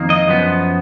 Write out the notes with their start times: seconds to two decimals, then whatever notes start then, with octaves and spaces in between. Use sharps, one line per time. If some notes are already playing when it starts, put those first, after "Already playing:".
Already playing: F2 D#3 A#3
0.10 D#5
0.27 F#2 F3 B3